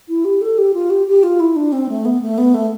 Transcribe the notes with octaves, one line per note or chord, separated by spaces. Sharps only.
E4
G4
A4
G4
F4
G4
G4
F4
E4
D4
C4
A3
B3
A3
B3
A3